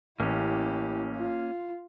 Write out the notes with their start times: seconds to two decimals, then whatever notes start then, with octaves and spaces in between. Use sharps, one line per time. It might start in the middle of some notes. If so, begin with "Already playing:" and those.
0.20 A1 A#3 C#4 E4 G4
1.17 F4